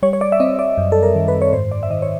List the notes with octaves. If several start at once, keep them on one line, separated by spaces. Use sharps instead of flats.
G3 C#5
C#5
D5
E5
C4 D#5
D5
F#2
A4
A#4
D#3
B4
C#5
G#2 C5
D5
E5
D#3 D#5
C#5